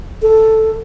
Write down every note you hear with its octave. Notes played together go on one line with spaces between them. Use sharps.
A4